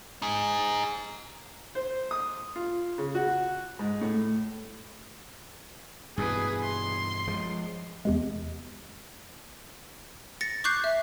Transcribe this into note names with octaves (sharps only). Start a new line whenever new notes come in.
D#4 G#4
C5
D#6
F4
C#3
F#4
G#2
A2
G2 B2 E3 G#4 B4
C6
F3 G#3
E2 C3 G#3
A6 A#6 C#7
C#6 D6 F#6 G6 C7
E5